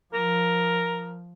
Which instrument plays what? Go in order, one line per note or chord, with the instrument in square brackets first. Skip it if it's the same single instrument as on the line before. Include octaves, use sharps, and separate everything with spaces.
[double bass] F3 [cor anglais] A#4